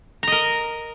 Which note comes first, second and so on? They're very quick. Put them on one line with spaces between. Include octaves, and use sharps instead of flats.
A#5 D#5 A#4